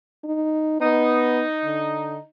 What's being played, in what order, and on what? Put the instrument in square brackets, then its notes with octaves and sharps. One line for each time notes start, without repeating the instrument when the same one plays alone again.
[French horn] D#4
[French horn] B3 [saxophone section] D#4
[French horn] D3